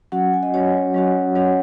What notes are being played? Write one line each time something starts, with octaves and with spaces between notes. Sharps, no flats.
F#3 C#4 F#4 F#5
G#5
D#5
F#3 C#4 F#4 C#5
F#3 C#4 F#4
F#3 C#4 F#4 C#5